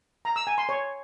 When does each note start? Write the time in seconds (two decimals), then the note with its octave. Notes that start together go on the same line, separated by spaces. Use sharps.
0.25 A#5
0.36 E6
0.47 G#5
0.58 C6
0.69 C#5